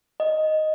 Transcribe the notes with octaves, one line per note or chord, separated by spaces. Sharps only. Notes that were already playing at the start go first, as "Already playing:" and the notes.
D#5